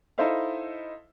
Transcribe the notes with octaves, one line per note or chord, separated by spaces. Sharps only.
D#4 E4 A4 C5 E5 F5